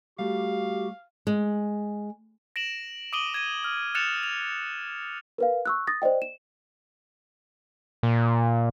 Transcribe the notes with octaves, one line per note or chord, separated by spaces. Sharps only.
G3 A3 F#4 G4 F5
G#3
A#6 D7 E7 F#7
D6 D#6 D7 D#7 F#7 G7
G#6 D#7
F6
F6 F#6 A6 C#7 E7 F7
F7
A#4 B4 F5
C#6 E6 F#6
D#6 A6 A#6
C5 D5 D#5 G5
E7
A#2